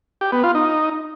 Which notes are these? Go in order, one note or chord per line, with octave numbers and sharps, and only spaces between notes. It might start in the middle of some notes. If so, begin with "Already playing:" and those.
G4
B3
F4
D#4